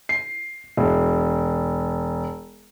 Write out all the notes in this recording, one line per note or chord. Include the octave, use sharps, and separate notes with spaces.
C7
E1